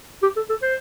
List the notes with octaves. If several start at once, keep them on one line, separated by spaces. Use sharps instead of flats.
G4
A4
A4
C5